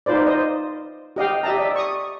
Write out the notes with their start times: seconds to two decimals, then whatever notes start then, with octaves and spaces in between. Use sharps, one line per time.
0.06 D#4 F4 B4 C5 D5
0.27 C5 D#5
1.16 G4 D#5 F5 G5
1.43 G4 D#5 E5 A5 A#5
1.57 D5 E5
1.76 C#6 D#6